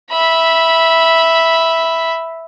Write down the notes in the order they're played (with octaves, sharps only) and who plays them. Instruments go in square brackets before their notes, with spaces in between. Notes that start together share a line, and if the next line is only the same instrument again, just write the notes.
[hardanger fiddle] E5 B5